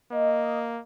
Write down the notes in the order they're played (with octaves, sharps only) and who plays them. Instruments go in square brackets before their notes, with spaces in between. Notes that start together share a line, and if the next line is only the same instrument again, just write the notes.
[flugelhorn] A#3 [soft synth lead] D#5